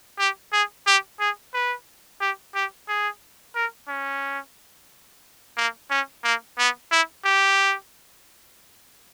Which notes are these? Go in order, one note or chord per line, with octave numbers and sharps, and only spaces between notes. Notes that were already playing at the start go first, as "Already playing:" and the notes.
G4
G#4
G4
G#4
B4
G4
G4
G#4
A#4
C#4
A#3
C#4
A#3
B3
E4
G4